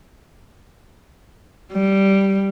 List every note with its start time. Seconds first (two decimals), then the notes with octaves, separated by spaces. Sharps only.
1.73 G3